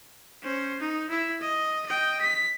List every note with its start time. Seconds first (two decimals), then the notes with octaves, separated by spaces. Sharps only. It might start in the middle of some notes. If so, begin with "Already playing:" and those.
0.42 C#4 C5
0.80 D#4
1.10 E4 E5
1.41 D#5
1.86 D#5 G5
2.21 B6